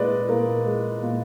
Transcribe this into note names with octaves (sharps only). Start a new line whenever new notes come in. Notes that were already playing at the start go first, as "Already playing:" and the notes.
Already playing: A#2 G#3 B4 D5 D#5
A#2 A#4
G#3
A#2